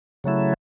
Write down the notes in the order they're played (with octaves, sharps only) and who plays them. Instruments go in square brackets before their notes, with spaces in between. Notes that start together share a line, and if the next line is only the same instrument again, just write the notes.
[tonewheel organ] C#3 F#3 A3 E4